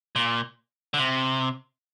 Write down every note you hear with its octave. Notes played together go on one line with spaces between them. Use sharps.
A#2
D3
C3